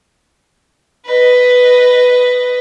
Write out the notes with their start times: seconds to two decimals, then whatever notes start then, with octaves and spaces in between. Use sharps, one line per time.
1.06 B4 D#5